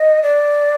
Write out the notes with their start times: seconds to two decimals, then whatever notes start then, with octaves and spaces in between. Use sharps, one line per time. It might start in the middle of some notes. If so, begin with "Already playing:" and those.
Already playing: D#5
0.22 D5